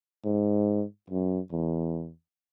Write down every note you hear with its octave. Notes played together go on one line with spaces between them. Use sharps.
G#2
F#2
E2